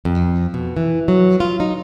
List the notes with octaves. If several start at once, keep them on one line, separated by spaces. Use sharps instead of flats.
F2
B2
E3
F#3
F4
D#4